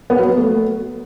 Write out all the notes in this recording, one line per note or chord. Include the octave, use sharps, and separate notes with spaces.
B3
F#3
B3
A3